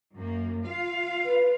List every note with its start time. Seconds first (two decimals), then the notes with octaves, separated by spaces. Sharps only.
0.15 F#2 A#3
0.65 F4 F5
1.25 B4